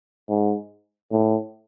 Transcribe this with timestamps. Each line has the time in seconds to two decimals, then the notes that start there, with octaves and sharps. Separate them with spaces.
0.29 G#2
1.12 A2